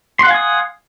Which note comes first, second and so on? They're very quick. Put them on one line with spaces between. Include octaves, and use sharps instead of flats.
C6 F#5 F5 G#5 D#6